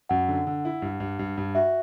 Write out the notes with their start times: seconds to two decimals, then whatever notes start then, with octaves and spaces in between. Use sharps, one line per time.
0.09 F#2 F#5
0.28 D3
0.47 D3
0.65 E4
0.82 G2
1.00 G2
1.19 G2
1.38 G2
1.55 F#4 E5